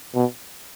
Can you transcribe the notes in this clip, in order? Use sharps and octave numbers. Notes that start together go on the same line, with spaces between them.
B2